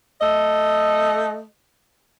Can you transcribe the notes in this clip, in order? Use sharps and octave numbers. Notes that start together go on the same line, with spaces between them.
A3 A4 D#5